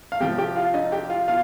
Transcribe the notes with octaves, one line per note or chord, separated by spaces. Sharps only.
F5
C3 F3 G4 G5
G4 G5
F4 F5
D#4 D#5
G4 G5
F4 F5
B2 F4 F5